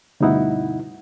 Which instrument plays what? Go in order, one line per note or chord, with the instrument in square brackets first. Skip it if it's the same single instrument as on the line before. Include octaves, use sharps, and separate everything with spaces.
[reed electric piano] D2 G2 B2 D#4 E4 F#5